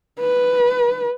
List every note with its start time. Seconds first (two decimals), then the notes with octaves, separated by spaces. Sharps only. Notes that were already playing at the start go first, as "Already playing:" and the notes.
0.20 B4